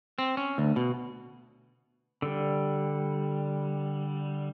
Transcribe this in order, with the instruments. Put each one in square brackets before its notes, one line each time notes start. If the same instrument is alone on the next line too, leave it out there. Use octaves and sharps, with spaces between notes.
[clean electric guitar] C4
C#4
D2
B2
[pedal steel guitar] D3 G3